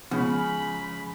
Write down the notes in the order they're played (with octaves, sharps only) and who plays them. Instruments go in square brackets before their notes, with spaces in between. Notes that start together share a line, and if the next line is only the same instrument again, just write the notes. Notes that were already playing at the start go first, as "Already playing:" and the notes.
[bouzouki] C#3 [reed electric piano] F3 G#3 [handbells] B3 C#4 [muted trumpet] B5